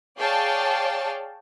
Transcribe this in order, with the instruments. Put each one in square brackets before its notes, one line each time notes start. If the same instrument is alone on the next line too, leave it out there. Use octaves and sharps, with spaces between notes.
[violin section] G#4 C#5 D5 F5 G5 A5